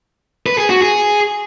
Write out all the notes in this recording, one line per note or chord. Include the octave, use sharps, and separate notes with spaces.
B4
G#4
F#4
G#4